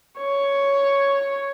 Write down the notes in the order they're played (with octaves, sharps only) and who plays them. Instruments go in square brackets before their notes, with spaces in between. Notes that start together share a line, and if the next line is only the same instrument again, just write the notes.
[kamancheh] C#5